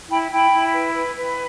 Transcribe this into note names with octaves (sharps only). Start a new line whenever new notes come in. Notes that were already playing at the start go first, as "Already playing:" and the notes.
E4 G5 B5
E4 G5 B5
E4
B4
B4
B4